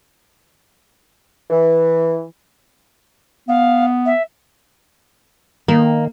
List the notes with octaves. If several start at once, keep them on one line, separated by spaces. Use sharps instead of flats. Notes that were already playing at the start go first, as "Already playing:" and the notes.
E3
B3 F5
E5
D#3 A#3